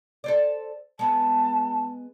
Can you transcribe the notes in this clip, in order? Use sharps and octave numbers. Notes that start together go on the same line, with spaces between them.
A4 C5 D5
G#3 B3 A5